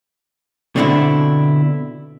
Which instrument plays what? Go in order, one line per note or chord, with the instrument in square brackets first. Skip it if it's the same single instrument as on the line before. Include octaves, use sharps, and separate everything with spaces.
[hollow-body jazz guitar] B2 D3 C4 D4 E4